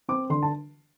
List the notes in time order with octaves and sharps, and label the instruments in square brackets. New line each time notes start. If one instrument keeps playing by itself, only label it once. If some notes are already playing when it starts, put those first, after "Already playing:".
[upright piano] C4 D6
D3 C6
A5